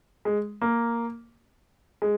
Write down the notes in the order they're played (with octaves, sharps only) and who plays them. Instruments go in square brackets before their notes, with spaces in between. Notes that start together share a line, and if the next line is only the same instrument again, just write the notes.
[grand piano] G#3
A#3
G#3